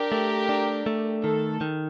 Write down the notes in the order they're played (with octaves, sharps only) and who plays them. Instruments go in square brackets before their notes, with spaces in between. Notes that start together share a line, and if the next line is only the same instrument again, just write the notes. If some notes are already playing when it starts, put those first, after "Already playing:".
Already playing: [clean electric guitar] D4 [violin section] G4 A#4
[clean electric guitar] A3
D4
A3
[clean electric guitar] D#3 [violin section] A4
[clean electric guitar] D#3